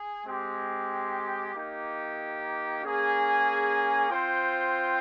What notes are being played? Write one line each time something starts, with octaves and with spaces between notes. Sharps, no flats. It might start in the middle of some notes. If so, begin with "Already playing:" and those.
Already playing: G#4
G#3 C4 G4
A#3 D#4 G4
A#3 C#4 G#4
C4 F4 C5 G5